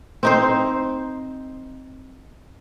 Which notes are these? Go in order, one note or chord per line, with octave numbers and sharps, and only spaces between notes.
C4 D#4 C5